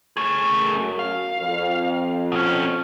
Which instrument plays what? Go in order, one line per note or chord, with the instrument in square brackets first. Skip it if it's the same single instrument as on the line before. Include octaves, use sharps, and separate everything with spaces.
[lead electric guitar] A3 G#4
[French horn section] F#2
[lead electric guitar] F5
[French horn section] F2
[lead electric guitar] B2 C#4